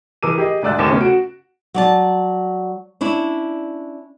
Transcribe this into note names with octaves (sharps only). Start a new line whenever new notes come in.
E3 G#4 A#4 D6 E6 D#7
G4 G#4 D#5
D2 G#2 D5 E6 F#6 A6
F1 D#2 D6 E7
C#3 A3 B3 C#4
F#4 D7
F#3 D5 A5
C#4 D4 E4